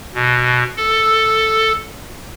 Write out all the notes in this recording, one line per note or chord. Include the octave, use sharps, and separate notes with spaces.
B2
A4